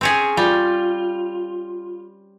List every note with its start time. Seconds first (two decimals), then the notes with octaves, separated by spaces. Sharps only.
0.01 C4 C#4 G#4
0.37 G3 F4